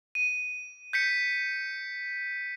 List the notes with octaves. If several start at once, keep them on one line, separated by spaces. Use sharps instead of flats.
D#7
G6 B6 C#7